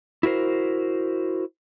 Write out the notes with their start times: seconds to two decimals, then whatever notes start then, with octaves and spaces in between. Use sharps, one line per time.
0.23 E4 F#4 A#4 C5